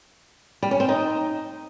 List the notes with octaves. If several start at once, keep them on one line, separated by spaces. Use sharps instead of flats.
G3
C#4
C4
D#4